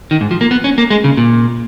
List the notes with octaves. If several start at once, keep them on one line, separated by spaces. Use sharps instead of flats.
D#3
G#2
F3
A#3
B3
C#4
A#3
G#3
C#3
A#2